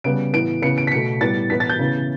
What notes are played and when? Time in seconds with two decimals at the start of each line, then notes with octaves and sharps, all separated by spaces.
0.04 C#3 G3 B3 D7
0.33 A2 E3 B3 D7
0.62 C#3 E3 B3 C#7
0.78 D7
0.87 B6
0.92 B2 A3 C#7
1.21 A2 G3 B3 A6
1.50 A2 E3 B3 B6
1.60 A6
1.70 G6
1.79 C#3 E3 B3